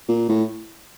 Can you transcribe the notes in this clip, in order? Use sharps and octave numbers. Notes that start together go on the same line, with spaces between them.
A#2
A2